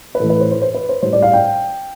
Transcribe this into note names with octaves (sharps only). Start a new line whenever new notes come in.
B4
A2 E3 A3 A4
B4
C5
C5
C5
B4
C5
A2 G3 C5
D5
F5
G5